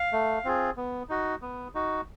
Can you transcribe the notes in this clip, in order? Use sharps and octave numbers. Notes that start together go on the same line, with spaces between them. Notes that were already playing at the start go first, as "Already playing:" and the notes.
Already playing: F5
A3
C4 F4 G#4
B3
D#4 F#4
B3
D#4 F#4